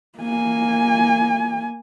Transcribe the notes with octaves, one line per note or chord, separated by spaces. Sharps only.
A#3 G#5